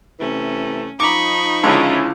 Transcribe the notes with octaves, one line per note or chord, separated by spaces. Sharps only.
C3 E3 A3 C#4
F3 D#4 A#5 B5 C#6 D6
C#2 D3 G#3 C#4 E4 F4